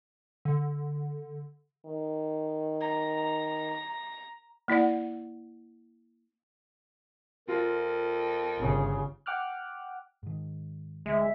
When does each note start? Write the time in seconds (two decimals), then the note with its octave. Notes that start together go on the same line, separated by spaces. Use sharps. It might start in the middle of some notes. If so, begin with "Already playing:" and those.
0.45 D3
1.86 D#3
2.81 A#5
4.68 A#3 E4 D5 F#5
7.48 F2 F4 A#4
8.59 G1 C#3
9.26 F#5 G5 D6 F6 F#6
10.23 G#2 D#3
11.06 D2 G#3 E5